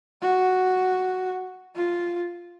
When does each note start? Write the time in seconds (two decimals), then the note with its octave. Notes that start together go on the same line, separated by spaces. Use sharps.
0.22 F#4
1.76 F4